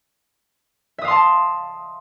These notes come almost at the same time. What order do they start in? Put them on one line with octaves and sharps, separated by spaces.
E5 D#6 F5 C6 A5